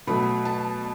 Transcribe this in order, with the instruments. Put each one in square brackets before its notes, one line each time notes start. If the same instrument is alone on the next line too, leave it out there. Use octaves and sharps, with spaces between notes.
[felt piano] B2 F#3 A3 B5
A5